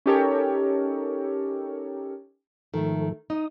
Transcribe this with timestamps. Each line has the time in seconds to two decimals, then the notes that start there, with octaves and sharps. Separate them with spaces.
0.06 C#4 D#4 G4 A4 A#4 C#5
2.74 G#2 D#3 F3 A3 A4
3.30 D#4 D#6